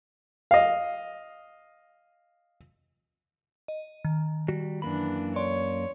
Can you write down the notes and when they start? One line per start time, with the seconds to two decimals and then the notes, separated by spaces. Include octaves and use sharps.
0.51 D#5 F5
3.68 D#5
4.05 D#3
4.48 G3 F#4
4.82 F#2 E3 A#3 D4 B5
5.36 C#5 D5 C6